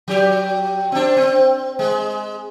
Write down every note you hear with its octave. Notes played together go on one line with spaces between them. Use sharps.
F#3 G4
C4 D4
C4
G#3